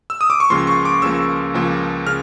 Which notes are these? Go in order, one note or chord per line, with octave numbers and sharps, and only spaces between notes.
E6
D#6
D6
C#6
C#2 C#3 F3 A#3 C6
C#6
D6
C#2 C#3 F3 A#3 E6
C#2 C#3 F3 A#3
C#3 F6